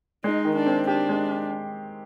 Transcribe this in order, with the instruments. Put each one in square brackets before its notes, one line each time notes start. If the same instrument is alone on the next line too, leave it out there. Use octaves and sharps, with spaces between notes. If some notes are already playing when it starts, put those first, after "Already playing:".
[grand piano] G#3 [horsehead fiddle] D#4
[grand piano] D#3
[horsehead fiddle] D4
[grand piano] C4
[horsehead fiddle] D4 [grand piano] G4
[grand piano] G#3